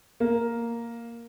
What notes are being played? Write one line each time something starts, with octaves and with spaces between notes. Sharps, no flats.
A#3